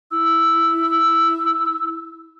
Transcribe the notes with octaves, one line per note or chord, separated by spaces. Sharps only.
E4 E6